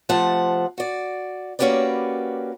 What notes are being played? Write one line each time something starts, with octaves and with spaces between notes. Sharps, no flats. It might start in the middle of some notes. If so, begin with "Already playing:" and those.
C3 F3 A3 F#5 A5
F#4 D5
A#3 C#4 F#4 G4 B4 D5